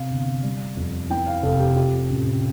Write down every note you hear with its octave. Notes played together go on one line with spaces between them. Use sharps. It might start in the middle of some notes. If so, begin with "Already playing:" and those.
Already playing: C3 F5
G1
G3
F2
E3 G5
F5
F1 A4
G4
F3 G4
A1